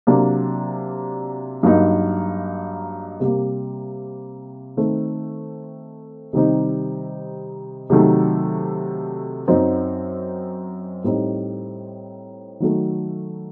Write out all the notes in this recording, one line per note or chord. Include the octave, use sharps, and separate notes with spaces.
C3 F#3 A#3 D4
G2 F#3 A#3 D#4
C3 G3 A#3
D#3 A3 C4
C3 D#3 G3 C4 D#4
C3 D#3 F#3 A3
F#2 F#3 C4 D#4
A2 G3 C4 D#4
D#3 F#3 A3